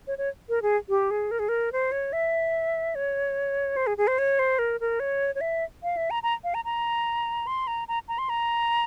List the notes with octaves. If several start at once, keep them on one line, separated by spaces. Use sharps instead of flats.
C#5
C#5
A#4
G#4
G4
G#4
A#4
G#4
A#4
C5
C#5
E5
C#5
C5
G#4
G#4
C5
C#5
C5
A#4
A#4
C#5
C#5
E5
F5
E5
A#5
A#5
F5
A#5
A#5
C6
A#5
A#5
A#5
C6
A#5